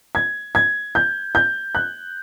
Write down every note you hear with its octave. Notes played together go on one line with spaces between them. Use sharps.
G#6
G#6
G6
G6
F#6